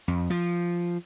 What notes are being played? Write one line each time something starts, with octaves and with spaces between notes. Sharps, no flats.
F2
F3